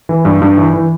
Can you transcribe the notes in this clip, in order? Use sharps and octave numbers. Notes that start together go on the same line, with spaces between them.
E3
G2
G2
E3
E3